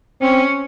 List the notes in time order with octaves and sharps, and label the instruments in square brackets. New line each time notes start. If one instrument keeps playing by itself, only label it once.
[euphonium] C4 [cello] C#4